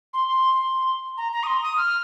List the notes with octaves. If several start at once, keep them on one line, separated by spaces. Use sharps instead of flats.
C6
C6
A#5
A#5
D#6
C6
D#6
F6